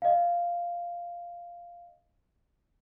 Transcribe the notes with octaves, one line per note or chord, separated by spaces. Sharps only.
D#5 F5